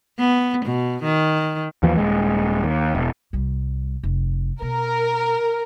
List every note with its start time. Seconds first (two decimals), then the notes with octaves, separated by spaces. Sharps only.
0.19 B3
0.65 B2
1.03 D#3
1.83 D#2 E3 F3
1.97 D#1 G#3
2.64 D#2
2.95 E1
3.33 C2 G3
4.03 F1
4.62 B2 A#4